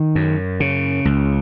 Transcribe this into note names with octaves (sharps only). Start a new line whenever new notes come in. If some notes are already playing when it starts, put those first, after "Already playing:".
Already playing: D#3
F#2
C#3
C#2